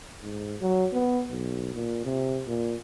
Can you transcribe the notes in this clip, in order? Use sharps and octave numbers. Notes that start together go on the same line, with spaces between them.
G#2
F#3
B3
B1
A#2
C3
A#2